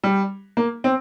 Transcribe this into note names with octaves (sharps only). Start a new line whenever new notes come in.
G3
A#3
C4